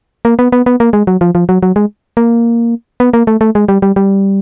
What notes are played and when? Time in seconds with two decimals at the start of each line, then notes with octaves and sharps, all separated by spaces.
0.25 A#3
0.39 B3
0.52 B3
0.66 B3
0.80 A#3
0.93 G#3
1.07 F#3
1.21 F3
1.35 F3
1.49 F#3
1.63 F#3
1.76 G#3
2.17 A#3
3.00 B3
3.13 A#3
3.27 A3
3.41 A3
3.55 G#3
3.69 G3
3.82 G3
3.96 G3